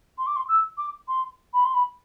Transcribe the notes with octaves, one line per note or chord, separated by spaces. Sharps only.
C6
D6
C6
E6
D6
C6
B5
C6
B5